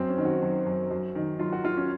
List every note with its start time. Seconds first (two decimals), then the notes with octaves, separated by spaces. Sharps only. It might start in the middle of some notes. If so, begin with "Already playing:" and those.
Already playing: F#2 C4
0.09 C#4
0.17 D#3
0.25 F#4
0.43 F#3
0.66 F#2
0.91 F#2
1.15 D#3
1.39 F#3 F4
1.52 F#4
1.64 F#3 F4
1.77 C#4